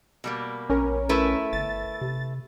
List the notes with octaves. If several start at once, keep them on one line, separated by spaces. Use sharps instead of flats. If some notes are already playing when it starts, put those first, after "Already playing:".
B2 G3 A#3
A#1 C#4 A#4
A3 E4 B4
G1 A6
C3